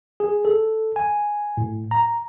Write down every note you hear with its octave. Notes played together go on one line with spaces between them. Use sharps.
G#4
A4
G#5
A2
A#5